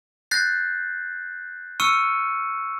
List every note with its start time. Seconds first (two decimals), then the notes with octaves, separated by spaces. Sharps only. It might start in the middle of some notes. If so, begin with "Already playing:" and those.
0.31 F#6 G6 A6 A#6 C7
1.80 C#6 E6 F6 C#7 D#7